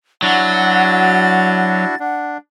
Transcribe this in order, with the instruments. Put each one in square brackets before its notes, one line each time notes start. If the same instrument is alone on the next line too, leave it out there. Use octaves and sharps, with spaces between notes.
[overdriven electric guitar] F#3 [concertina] D4 E4 F#4 [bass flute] F#5 [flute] A6
[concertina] D4 [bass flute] F#5